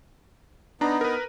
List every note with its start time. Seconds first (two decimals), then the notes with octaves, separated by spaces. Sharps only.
0.81 B3 D4 D#4 A#5
1.01 A#4 B4